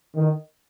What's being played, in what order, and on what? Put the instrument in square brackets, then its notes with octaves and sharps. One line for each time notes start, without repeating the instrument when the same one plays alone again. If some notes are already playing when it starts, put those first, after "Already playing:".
[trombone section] D#3